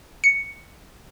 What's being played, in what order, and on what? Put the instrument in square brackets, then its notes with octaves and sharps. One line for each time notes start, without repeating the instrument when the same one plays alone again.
[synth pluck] C#7